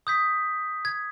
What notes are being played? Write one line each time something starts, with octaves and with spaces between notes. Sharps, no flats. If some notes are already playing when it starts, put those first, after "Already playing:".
D#6 G6 B6
G#6